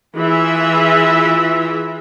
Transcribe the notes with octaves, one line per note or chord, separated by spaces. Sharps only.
E3 F4 G#4 E5